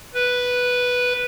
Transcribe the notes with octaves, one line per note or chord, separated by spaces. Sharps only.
B4